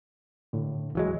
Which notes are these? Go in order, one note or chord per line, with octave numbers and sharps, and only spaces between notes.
A2 D3
D1 E3 F#3 G#3